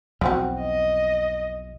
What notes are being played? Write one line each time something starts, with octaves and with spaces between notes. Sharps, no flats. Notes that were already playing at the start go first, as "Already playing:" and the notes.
B1 E2 F3 C4 F#4
D#5